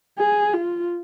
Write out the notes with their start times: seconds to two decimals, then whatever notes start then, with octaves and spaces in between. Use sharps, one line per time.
0.18 G#4
0.53 F4